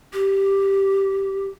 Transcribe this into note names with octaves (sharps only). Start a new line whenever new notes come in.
G4